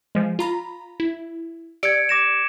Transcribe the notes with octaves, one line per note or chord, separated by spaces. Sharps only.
F3 G#3
F4 A#5 B5
E4
G4 D5 E6 G#6 C#7 D7
D6 A#6 E7